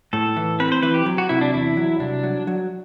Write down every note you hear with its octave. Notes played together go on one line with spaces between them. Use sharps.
A2 A4
E3
C4 B4
C5
E3 B4
G4
F#3
F#4
C3 E4
D4
E2 E4
F#3
C2 D4
F#3
F#3